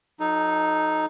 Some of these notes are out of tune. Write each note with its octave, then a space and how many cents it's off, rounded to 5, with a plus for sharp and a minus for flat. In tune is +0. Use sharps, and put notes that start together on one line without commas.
F#3 -35 D#4 +0 A4 -15